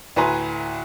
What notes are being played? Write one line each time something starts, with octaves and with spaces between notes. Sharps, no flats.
D2 A2 B4 G#5 A#5 C6